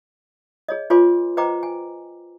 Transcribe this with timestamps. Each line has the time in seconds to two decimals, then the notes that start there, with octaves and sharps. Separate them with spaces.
0.68 G#4 C#5 D#5
0.90 F4 B4 C#5 G#5 C6 D6
1.37 B4 C5 D#5 G5 A#5 D6
1.63 G#5